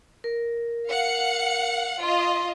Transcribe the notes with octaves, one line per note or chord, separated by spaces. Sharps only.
A#4
F5 F#5 C#7
F4 D#5 C6